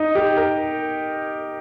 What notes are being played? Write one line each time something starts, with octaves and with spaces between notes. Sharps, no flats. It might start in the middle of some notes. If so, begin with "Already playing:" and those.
Already playing: D#4
G4
A#4